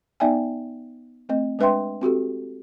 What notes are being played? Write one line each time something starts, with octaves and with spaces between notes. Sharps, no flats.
B3 D#4 D5 E5 G5 G#5
A3 C4 D#5
G#3 D4 B4 E5 G5 C6
C4 F#4 G4 A4